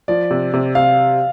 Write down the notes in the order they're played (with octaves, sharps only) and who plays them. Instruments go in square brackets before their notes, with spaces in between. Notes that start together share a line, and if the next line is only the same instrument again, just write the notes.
[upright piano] F3 [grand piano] D5
[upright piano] C3
C3
[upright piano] C3 [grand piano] F5